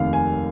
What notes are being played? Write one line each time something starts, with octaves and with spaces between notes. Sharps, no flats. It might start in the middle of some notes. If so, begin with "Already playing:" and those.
Already playing: F1 D#2 D#3 F5
G#5